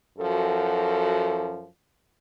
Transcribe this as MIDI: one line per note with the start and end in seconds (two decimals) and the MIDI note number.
0.19 1.66 42
0.19 1.66 53
0.19 1.66 66
0.19 1.66 69